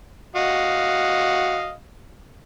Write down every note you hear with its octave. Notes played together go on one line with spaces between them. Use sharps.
F#4 D#5 F5